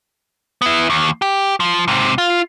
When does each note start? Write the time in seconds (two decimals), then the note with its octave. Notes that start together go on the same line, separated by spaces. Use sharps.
0.62 B3 E4
0.90 D#2
1.22 G4
1.60 F3
1.88 G#2 C3
2.18 F4